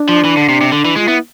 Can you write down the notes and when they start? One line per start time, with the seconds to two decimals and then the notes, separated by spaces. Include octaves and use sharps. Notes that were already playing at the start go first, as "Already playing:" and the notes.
Already playing: D4
0.09 F3
0.25 E3
0.37 D3
0.49 C3
0.61 C3
0.72 D3
0.85 E3
0.96 G#3 F4
1.08 B3 E4